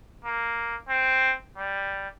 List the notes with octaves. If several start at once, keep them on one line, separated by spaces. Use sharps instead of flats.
A#3
C4
G3